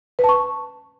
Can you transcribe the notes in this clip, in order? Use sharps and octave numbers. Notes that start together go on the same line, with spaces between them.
B4
A5
C#6